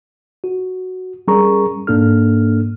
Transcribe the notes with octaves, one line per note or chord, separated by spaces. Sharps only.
F#4
G3 C#4 G#4 A#4 A#5 C#6
G#2 A#3 D4 A4 F6